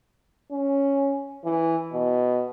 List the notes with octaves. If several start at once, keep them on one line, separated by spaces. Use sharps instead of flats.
C#4
E3
B2